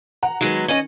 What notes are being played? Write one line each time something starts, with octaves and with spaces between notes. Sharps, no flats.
F#5 A#5
D#3 F#3 G#3 B3
C#4 D#5